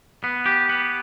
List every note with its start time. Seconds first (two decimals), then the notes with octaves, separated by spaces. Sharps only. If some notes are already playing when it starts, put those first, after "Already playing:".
0.24 B3
0.46 G4
0.69 B3